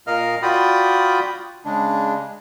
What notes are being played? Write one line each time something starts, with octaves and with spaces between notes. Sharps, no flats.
A#2 A#4 D#5 F5 F6
F4 F#4 D5 G5 B5 D#6
C#3 G#3 D4